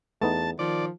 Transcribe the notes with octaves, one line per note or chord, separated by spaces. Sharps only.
E2 A3 B3 D#4 A5
D#3 F3 D5